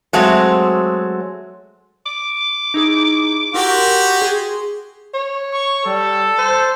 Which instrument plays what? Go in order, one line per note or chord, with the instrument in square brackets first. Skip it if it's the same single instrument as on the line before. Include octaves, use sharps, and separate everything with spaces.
[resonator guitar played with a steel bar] F#3 G#3 A3 C4
[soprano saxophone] D6
[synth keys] D#4 E4 G#4
[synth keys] E4 A#4 C6 [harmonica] F#4 G4
[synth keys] G#4 C6
[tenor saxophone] C#5
[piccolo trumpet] C#6
[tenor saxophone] G3 [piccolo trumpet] A4
[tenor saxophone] C5